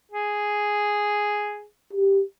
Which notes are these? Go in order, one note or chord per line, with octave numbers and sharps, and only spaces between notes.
G#4
G4